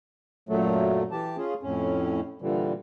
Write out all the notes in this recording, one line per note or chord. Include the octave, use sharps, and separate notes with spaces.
F#2 A#2 F#3 A3
E3 G4 A5
C#4 F4 G#4
F2 A2 C#4
A#2 D3 E3 G3